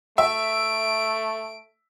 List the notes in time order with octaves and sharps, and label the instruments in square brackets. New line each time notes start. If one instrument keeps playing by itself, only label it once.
[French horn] A3 [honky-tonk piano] E5 [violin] D7